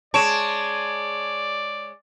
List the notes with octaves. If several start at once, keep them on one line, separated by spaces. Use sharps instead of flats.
G#3 C#5 D5 A5 D7 E7